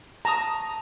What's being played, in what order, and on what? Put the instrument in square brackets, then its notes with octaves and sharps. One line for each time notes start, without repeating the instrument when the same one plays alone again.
[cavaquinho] A5 C#6 D#6 [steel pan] A#5